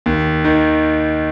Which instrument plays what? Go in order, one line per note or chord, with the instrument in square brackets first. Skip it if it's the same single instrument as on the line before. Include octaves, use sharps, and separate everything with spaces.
[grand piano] D#2
D#3